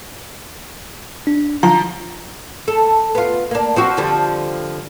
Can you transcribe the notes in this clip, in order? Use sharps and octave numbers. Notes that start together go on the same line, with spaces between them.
D4
F3 A#5
A4
B3 F4
A#3 D4
F3 C4 F#4
D3 F3 G3